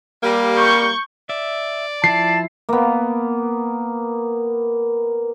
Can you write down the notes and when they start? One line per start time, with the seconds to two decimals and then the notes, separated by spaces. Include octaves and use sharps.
0.23 G3 A#3
0.56 C#6 G6
1.29 D5 E5
2.04 F3 E4 A5 C7
2.69 A#3 B3